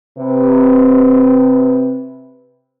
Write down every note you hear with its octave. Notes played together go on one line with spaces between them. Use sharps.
C3 C4 B4